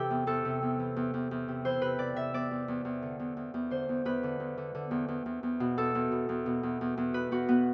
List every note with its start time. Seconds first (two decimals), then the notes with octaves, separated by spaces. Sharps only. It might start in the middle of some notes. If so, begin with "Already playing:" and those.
Already playing: C3 E3 G4 A4
0.10 E2
0.27 E2 A4
0.45 C3
0.62 E2
0.79 E3
0.96 E2
1.14 E2
1.31 E2
1.48 C3
1.65 E3 C5
1.82 C3 B4
1.99 C3 D5
2.16 C3 E5
2.33 E2 D5
2.51 E2
2.68 E2
2.85 E2
3.02 D3
3.19 E2
3.37 E2
3.54 E2
3.71 D3 C5
3.89 E2
4.05 E2 B4
4.23 D3
4.40 E2
4.57 D3
4.75 D3
4.91 E2
5.08 E2
5.26 E2
5.43 E2
5.60 B2
5.77 E2 A4
5.95 E2
6.12 B2
6.29 E2
6.46 B2
6.63 E2
6.81 E2
6.97 E2
7.14 B2 B4
7.31 E2 F#4
7.49 B2 B3